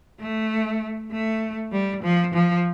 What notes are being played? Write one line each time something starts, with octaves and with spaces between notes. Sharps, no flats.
A3
A3
G3
F3
F3